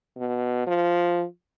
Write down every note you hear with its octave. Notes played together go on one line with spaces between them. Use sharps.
B2
F3